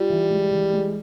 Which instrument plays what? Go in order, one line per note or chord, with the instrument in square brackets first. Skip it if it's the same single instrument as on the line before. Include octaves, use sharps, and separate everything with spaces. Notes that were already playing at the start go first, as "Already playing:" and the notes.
Already playing: [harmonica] G3 [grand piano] F4
[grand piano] E3
G#3
E3
G#3